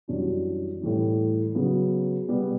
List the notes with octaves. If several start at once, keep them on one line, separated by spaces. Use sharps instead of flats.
F#2 E3 G3 D4 F#4
A2 E3 G3
C#3 F#3 B3
B2 G3 B3